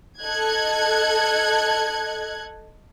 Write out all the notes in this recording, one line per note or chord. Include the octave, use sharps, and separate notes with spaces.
A4 D#5 F#6 G#6